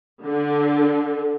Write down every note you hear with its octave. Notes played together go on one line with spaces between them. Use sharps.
D3